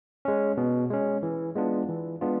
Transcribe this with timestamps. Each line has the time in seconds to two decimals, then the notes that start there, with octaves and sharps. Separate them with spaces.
0.25 G#3 C#4
0.57 B2
0.90 G#3 C#4
1.23 E3
1.55 G#3 B3 D4 F4
1.89 E3
2.21 G#3 B3 D4 F4